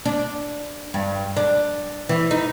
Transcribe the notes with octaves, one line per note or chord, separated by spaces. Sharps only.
D4
G2
D4
E3
D#4